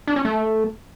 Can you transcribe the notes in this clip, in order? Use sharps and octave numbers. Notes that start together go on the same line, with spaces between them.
D4
C#4
A3